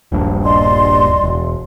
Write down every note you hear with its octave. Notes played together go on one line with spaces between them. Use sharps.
D#1 A#1 G2
D5 D#5 C6
E1